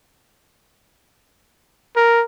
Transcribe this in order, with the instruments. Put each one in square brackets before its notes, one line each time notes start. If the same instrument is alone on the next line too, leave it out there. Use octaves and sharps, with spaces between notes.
[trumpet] A#4